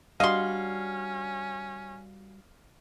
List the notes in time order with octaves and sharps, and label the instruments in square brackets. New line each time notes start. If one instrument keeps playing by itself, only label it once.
[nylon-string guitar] G3 D4 F#4 [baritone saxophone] C#4 [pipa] D#5 C6 [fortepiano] F5